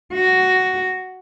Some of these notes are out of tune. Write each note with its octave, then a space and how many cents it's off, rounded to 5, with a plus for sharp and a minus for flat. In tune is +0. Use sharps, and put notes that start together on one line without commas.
F#4 +5